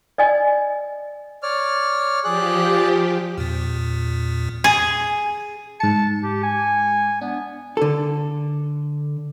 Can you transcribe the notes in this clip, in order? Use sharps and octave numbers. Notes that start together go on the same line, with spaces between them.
D5 D#5 G#5
C#5 D5 F6
F3 G4 G#4 D5 F#6
E2 A#2
G#4
G#2 A5 C#7
G4
G#5
B3 D4
D3 A4